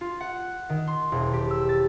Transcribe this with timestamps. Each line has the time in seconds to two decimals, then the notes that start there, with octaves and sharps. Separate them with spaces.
0.01 F4
0.21 F#5
0.69 D#3
0.87 C6
1.12 E1
1.33 G4
1.50 E6
1.69 A6